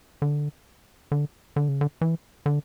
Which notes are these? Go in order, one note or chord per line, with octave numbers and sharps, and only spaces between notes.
D3
D3
D3
C#3
D3
E3
D3